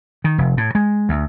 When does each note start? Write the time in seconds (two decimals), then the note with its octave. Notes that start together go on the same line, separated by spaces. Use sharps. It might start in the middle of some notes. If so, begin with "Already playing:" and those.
0.24 D#3
0.38 F1
0.57 A2
0.75 G#3
1.09 D2